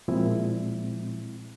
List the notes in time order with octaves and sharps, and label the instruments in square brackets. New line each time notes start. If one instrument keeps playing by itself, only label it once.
[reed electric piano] A#2 F3 G#3 C4 E4